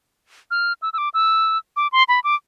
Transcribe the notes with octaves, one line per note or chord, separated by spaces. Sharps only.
F6
E6
E6
D6
E6
D6
C6
B5
D6